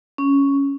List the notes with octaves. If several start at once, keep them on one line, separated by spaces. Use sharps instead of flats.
C#4